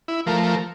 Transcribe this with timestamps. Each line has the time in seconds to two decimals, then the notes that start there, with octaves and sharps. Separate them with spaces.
0.08 E4
0.26 F3 A3 A#4
0.44 A#4